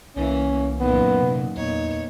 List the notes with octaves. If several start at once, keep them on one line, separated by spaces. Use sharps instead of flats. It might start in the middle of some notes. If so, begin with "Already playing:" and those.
C2 E3 A#3 C#4
F#2 A#2 D#3 B3
C3
E2 A#2 B3 D#4 C#5